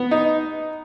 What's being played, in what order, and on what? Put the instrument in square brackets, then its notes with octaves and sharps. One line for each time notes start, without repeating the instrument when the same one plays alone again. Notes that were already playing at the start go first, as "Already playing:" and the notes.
Already playing: [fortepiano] B3
D#4